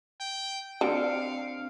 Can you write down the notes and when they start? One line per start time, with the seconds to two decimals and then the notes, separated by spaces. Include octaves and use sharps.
0.20 G5
0.81 D3 C4 F5 C#7 D7